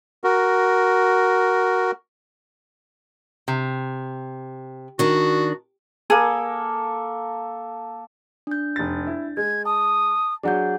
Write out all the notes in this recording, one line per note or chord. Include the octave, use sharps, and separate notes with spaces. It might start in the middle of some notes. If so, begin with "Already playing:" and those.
F#4 A#4
C3
D#3 D4 F#4
A#3 G#4 A4
D4 G6
F1 A6
E4
G#3 G#6
A5 D#6
F#3 D4 G#4 F#5 G6